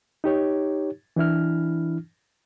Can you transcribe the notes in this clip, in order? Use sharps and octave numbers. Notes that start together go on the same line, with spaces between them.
D#4 G4 C#5
E3 D4 E4 F6